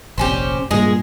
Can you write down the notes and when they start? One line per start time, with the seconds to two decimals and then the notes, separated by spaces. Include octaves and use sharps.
0.18 F1 A#1 C4 C#4 G4
0.71 G2 A#2 G#3 G#4